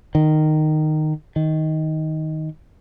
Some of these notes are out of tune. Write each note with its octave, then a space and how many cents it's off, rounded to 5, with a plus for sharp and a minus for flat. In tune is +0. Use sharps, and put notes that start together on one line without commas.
D#3 -10
D#3 +10